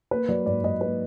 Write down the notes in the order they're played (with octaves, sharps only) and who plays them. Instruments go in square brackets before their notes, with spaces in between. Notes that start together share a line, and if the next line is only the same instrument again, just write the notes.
[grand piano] A#3 B4
F#3 D5
G#2 D5
G#2 D#5
A#3 B4